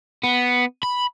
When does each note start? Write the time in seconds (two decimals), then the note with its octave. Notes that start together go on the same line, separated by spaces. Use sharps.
0.23 B3
0.83 B5